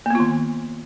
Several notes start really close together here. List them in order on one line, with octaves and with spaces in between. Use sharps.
A#3 B3 F4 D#3